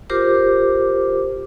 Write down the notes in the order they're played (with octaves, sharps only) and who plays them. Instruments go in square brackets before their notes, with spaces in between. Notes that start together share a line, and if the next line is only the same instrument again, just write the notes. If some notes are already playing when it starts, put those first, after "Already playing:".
[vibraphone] F4 G4 A#4 C5 D6